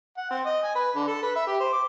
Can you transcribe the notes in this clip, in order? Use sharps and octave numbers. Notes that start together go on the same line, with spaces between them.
F#5
C4
D#5
G#5
B4
D3
A4
B4
E5
G4
C5
D6